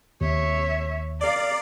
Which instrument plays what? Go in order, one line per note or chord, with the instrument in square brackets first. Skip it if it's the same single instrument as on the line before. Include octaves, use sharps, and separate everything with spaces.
[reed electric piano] D#2 [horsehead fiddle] C#5 E5
[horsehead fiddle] A#4 F5 [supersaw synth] D5